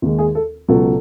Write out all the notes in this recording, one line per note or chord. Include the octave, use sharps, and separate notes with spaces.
D#2 D#3 G#3
G#4
A4
C#2 B2 F#3 A4